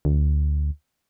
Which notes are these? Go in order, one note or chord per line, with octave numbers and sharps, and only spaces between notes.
D2